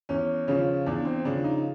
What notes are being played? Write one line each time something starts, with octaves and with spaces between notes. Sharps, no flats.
E2 C#4
C#3 F3 C#4
E2 D4
C4
C#3 F3 D4
D#4